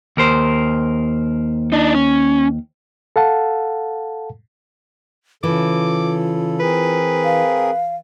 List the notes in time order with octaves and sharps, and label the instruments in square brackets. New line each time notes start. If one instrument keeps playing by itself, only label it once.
[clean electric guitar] D#2 A#4 C5
[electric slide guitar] D4 D#4
C#4
[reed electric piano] A4 F5 F#5 A5
[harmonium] C#3 A4 [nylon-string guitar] E3 [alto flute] F4 [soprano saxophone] D6
[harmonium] C4 G#4 A#4 [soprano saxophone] B4
[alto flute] F5